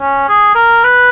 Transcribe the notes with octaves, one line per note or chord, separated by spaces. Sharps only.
C#4
G#4
A#4
B4